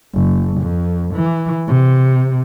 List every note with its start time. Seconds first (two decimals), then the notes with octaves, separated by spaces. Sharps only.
0.14 F#1
0.62 F2
1.15 E3
1.68 C3